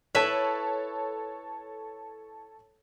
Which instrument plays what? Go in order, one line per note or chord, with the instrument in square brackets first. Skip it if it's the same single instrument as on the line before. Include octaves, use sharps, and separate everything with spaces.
[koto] E4 B4 E5 [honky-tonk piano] A4 C#5